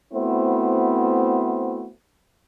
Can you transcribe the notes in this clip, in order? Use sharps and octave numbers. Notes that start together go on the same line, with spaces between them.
A3 B3 C4 E4 F#4 C5